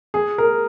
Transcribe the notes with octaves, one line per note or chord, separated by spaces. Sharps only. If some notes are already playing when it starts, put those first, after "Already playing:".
G#4
A#4